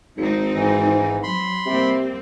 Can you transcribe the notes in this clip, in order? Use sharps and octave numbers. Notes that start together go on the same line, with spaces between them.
G#1 G#3 C4 D#4
G#2 E3
F#3 B5 C6
C3 G3 A#3 C4